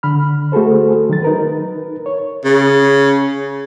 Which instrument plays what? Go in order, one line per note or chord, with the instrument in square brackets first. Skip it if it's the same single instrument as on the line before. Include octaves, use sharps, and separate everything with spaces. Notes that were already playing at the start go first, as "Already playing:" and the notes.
[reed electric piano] D3 B5 F6
A3 F#4 G#4 A4 C5
D#3 F#3 A6
D#4 A#4 B4
C#5
[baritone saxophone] C#3